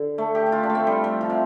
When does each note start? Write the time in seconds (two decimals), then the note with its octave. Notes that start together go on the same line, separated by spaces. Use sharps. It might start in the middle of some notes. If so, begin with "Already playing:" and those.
Already playing: D3
0.18 A3
0.35 G4
0.46 G4
0.52 F4
0.63 D4
0.70 A3
0.75 C4
0.87 G3
1.04 G3
1.21 F3
1.30 C3